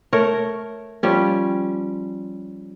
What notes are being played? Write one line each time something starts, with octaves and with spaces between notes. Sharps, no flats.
A3 A#4 C#5
F3 G3 C#4